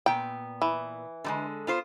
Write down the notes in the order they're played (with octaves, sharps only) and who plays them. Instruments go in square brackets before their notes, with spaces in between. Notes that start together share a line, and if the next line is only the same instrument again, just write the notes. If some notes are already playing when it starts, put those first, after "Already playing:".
[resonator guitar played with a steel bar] A#2 B3 [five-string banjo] G5
[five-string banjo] E3
[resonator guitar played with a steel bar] D3 G3 G#3
B3 F4 C5